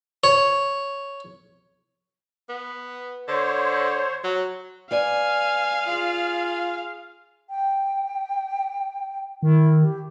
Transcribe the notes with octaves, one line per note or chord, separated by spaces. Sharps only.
C#5
B3
D3 C5 C#5
F#3
B4 D5 F5 G#5
F4 G#4
G5
D#3 E4
G4